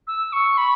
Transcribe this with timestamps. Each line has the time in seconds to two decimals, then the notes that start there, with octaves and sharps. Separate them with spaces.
0.07 E6
0.33 C#6
0.57 B5